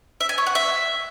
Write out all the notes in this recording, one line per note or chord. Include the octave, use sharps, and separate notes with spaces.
E5
G#5
C#5
F#5
E5